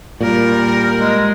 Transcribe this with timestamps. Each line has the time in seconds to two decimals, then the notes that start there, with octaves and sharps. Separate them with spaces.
0.21 A#2 G3 A#4
0.97 G#3